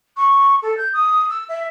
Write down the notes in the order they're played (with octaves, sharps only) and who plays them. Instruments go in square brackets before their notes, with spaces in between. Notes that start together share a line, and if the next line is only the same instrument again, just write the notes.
[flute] C#6
A4
G6
D#6
E6
E5